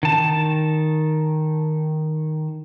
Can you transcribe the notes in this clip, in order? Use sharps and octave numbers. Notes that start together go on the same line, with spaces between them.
D#3 A5